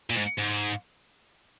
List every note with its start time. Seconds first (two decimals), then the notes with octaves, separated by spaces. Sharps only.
0.10 A#2
0.15 G#2
0.38 G#2